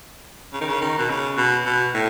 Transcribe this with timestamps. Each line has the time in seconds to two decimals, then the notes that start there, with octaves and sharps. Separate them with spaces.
0.53 C#3
0.61 D#3
0.68 C#3
0.81 D#3
0.98 B2
1.10 C#3
1.37 B2
1.66 B2
1.94 A2